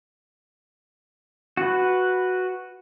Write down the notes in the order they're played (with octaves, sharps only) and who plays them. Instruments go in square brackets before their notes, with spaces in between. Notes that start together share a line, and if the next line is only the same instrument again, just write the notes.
[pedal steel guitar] F#4 B4